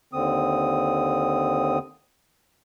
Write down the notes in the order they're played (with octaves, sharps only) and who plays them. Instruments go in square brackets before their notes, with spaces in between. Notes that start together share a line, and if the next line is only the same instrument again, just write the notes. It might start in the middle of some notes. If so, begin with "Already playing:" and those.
[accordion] D#2 D3 C4 D#6